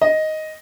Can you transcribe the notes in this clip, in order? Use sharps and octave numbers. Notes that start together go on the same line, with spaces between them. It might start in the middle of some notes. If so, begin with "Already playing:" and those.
D#5